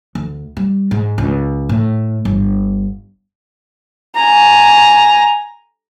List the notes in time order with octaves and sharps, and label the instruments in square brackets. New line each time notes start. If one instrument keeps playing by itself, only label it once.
[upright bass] D2
G3
G#2
C#2
A2
G1
[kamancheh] G#5 A#5